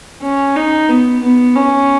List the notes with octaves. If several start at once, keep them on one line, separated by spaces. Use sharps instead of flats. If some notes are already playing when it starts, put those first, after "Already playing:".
C#4
D#4
B3
B3
C#4